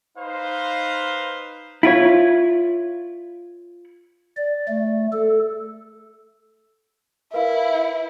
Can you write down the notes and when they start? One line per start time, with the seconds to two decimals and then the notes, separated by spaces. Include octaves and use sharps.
0.18 D#4 B4 C5 F5
1.83 E4 F4 C#5
4.37 D5
4.68 A3
5.13 A4
7.33 E4 A#4 B4 F5